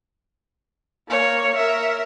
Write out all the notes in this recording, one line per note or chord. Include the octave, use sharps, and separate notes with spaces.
A#3 C#5
A#4 E5